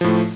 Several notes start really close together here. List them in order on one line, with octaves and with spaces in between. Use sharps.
F3 A2 A3